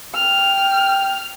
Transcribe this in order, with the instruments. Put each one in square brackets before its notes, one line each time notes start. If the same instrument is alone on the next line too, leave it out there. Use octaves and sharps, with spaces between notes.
[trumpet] G5 [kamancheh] F6